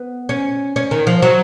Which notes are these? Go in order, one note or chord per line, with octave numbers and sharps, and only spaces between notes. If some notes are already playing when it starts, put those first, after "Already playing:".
Already playing: B3
C#4
C#4
D#3
F3
F#3